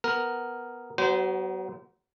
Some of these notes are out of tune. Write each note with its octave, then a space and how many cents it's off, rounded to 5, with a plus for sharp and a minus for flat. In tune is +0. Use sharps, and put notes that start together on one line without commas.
B3 +0 A#4 +0
F#3 +35 B3 +0 C5 -30